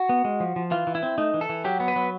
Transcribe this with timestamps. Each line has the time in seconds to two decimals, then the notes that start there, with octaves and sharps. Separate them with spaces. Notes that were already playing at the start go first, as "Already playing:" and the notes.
Already playing: F#4
0.09 B3
0.25 G#3
0.40 F3
0.56 F3
0.71 E3 F4
0.87 E3
0.95 E4
1.03 C4
1.18 A3 D#4
1.34 E3
1.41 A4
1.49 E3
1.64 F#3 G4
1.80 B3
1.88 B4
1.96 F#3